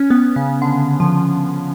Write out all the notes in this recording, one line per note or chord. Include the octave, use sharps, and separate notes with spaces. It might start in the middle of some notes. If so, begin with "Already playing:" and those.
Already playing: C#4
B3
C#3
D3
F3